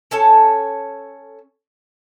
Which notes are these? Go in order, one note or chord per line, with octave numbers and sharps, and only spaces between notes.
C#4 A4 C#5 A5